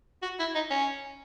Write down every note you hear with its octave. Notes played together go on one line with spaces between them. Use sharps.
F#4
E4
D#4
C#4